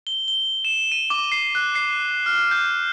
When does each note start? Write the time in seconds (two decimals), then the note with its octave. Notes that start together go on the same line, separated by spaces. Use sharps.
0.07 G7
0.28 G7
0.65 E7
0.92 D#7
1.10 D6
1.32 C7
1.55 F#6
1.75 C7
2.26 F6
2.51 G6